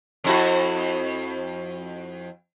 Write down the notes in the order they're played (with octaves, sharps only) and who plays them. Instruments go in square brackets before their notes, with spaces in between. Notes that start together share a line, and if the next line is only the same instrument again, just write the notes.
[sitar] F2 E4 F#4